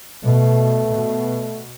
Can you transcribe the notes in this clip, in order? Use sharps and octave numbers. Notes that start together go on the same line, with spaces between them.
B2 A3
B2